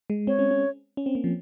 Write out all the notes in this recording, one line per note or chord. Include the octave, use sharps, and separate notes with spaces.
G#3
C4 C#5
C#4
C#4
C#4
C4
A#3
F3